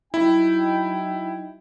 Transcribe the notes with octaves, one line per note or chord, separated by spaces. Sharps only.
F#3 D#4 E4 G5